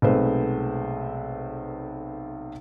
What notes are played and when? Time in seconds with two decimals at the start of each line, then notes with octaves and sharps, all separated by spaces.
0.02 B1 C3 G#3 A3 B4 C5